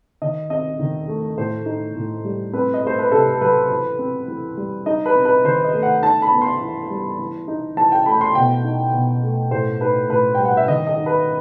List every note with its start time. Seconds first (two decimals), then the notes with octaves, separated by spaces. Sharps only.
0.22 D#3 D#5
0.50 C4 D#5
0.79 D#3
1.08 A3
1.37 A2 C5
1.66 D#4
1.96 A2
2.25 G3
2.53 C4 B4
2.74 D#5
2.82 A3 C5
2.99 B4
3.12 C3 A4
3.41 F#3 B4
3.70 E3
3.99 C4
4.28 E3
4.57 G3
4.86 D#4 D#5
5.06 B4
5.15 C4
5.25 B4
5.44 D#3 C5
5.64 D#5
5.74 A3
5.83 F#5
6.02 D#4 A5
6.22 B5
6.32 B3
6.42 C6
6.61 E3
6.90 G3
7.19 E3
7.48 D#4
7.77 E3 A5
7.92 G5
8.06 A3 B5
8.21 C6
8.35 B2 G5
8.64 D#4
8.93 B2
9.23 A3
9.51 A2 C5
9.81 D#4 B4
10.09 A2 B4
10.35 G3 G5
10.45 F#5
10.57 E5
10.68 D#3 D#5
10.87 D#5
10.97 D#4
11.06 B4